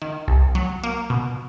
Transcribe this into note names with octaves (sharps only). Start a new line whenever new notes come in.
D#3
C2
F#3
A#3
B2